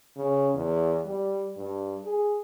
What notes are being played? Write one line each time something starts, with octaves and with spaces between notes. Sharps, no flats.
C#3
E2
G3
G2
G#4